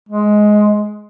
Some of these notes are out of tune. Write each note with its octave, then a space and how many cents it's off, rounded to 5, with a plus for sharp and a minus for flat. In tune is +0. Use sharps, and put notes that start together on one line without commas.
G#3 +10